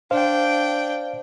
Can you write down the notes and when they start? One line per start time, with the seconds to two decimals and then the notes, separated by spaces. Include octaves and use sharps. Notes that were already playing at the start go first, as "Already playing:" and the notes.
0.11 D4 C5 F5 G5